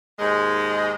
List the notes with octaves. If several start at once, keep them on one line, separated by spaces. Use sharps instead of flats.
D#2 G#2 G#3